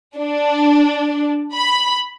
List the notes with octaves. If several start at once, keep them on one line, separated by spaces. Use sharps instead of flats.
D4
B5